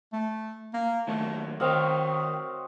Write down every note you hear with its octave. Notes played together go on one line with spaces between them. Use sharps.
A3
A#3
D#3 F#3 A3 A#3
D#3 C4 F#4 C5 C#5 D#5 F5